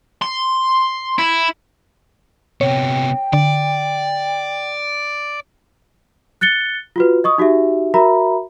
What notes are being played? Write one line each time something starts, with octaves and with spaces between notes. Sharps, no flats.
C6
E4
C3 B3 C#5 G5
D3 D5
F#6 A6 C#7 G7
F4 F#4 B4
D#5 C#6 D#6
D#4 F#4 G4 E5
F#4 A#4 E5 A#5 B5